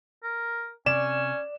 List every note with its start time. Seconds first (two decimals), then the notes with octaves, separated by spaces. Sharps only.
0.23 A#4
0.86 C3 C#4 D5 E7